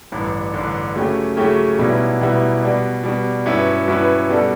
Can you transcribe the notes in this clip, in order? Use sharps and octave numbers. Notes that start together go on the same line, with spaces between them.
A1 G2 D3
A1 G2 D3
C#3 F#3 A3 C#4 G4
C#3 F#3 A3 C#4 G4
B1 B2 G3 B3 E4
B1 B2 G3 B3 E4
B2 G3 D4
B2 G3 D4
G2 F#3 C#4 E4 B4
G2 F#3 C#4 E4 B4
B2 G3 D4 A4